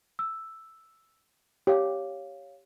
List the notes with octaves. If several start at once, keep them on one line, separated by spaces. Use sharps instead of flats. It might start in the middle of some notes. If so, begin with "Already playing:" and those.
E6
G4 C#5 F5